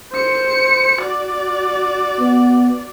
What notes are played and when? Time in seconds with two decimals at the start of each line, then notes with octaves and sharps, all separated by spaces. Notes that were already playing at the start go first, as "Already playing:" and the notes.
0.13 C5 C#7
1.01 F#4 D5
2.20 B3